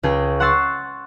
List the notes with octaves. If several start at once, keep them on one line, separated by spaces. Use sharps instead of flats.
C#2 C#3 G#4 G5
F#5 C6 C#6 E6 A6 C7